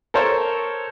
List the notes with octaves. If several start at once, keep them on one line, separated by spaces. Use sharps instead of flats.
A4 A#4 C5 C#5